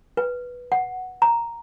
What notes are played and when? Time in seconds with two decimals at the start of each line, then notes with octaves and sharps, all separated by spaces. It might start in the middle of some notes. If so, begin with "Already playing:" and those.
0.17 B4
0.72 F#5
1.22 A#5